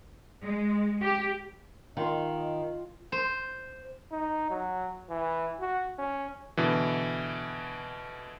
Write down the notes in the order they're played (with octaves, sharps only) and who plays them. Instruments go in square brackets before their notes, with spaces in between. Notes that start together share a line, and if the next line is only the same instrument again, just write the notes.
[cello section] G#3
G4
[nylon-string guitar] D#3 [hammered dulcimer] F4 C6 [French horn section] D#5
[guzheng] C5
[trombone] D#4
F#3
E3
F#4
C#4
[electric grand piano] B2 D3 E3